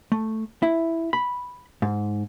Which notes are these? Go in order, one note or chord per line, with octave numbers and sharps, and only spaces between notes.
A3
E4
B5
G#2